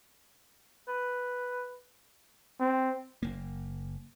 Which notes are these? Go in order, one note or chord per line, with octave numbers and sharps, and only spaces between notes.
B4
C4
F#1 A#3